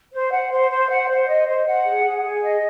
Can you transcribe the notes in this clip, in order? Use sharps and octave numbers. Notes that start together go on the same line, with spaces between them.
C5
F#5
C5
C5
F#5
C5
D#5
C5
F#5
G#4
G#4
G#4
D#5